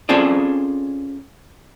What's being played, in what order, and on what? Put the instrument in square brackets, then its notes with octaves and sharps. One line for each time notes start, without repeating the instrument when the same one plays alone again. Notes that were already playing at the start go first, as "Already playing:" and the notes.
[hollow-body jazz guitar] C4 C#4 F4 G#4 A4 D5